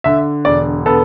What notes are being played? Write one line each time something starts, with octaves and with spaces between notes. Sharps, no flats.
D3 E5
E1 D5
B3 A4